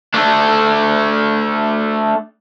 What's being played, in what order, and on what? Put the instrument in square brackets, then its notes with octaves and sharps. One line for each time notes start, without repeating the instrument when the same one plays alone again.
[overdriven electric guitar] A3 D4